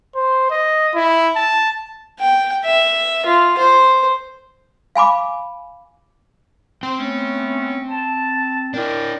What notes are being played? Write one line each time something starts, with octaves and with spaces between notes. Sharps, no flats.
C5
D#5
E4
A5
G5
E5
F4
C5
F5 G#5 B5 D6
C4 G5
A3 B3 C#4
A5
D4 E4 A#4 D5 G5